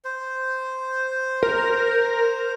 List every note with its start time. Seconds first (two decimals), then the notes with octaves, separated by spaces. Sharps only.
0.05 C5
1.43 A#4